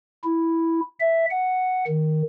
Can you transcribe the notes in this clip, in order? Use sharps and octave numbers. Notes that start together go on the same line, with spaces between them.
E4
E5
F#5
D#3